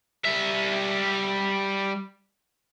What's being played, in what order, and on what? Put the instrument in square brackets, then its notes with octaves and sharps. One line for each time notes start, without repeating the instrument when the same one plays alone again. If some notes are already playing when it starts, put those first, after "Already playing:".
[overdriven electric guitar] G3 E5